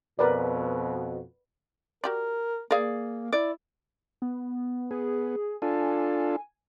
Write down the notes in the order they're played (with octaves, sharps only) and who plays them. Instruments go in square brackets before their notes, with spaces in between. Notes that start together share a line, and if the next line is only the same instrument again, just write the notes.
[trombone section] F2 B2 [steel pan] A#4 B4 D5
[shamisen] F#4 G4 D5 [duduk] A#4
[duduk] A#3 [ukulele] G#4 D5 [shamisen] A#4 F5
[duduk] E4 [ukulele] D5
[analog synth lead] B3
[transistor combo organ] B3 [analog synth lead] G#4
[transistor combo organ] D4 F4 A4 [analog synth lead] G#5